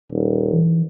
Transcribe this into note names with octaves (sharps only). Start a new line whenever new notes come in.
D#1
E3